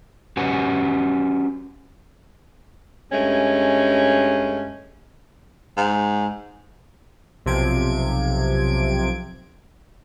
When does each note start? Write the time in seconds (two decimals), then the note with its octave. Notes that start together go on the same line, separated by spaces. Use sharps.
0.37 C#4 F#4 G4 B4 F#5 G#5
3.12 G2 G#3 A3 C#4
5.77 G#2
7.46 B1 C3 F3 G#6 D7